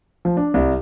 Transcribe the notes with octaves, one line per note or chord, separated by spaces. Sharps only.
F3
D4
C2